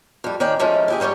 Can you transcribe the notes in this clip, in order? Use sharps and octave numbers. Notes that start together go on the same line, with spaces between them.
F2 G3
D#3 C#4 D5 G5
F3 G#3 A3 C#4
E4 G4 G#4
G#2 G3 C#4 G4 C#5